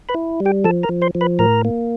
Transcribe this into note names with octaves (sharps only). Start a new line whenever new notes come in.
B4 B5
E4
G3
G4 G5
F3 A4 A5
A#4 A#5
F3
C5 C6
F3
B4 B5
A2 A#4 A#5
A#3